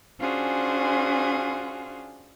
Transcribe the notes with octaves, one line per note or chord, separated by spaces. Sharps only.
C#4 D4 F4 F#4 G#4 C5